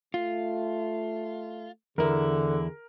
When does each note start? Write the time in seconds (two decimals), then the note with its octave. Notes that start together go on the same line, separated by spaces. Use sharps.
0.14 A3 F4
1.98 E2 D3 E4 G#4 A#4